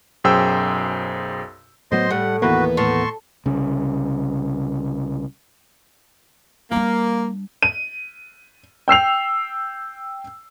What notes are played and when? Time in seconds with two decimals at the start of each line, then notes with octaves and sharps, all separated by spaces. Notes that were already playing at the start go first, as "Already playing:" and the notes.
0.24 B1 F#2 G#4 C5 G5 E6
1.92 A2 F#3 B3 C5 D#5 C6
2.10 A2 G3 F#5
2.42 D#2 E3 A#3 B3 F#4 B4
2.77 A2 A5 C6 C#6
3.46 C2 C#3
6.71 G3 A#3 D4
7.63 D#7
8.88 G5 E6 C7 F7